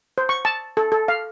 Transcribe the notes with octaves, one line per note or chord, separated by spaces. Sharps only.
C5
C#6
A5
A4
A4
F5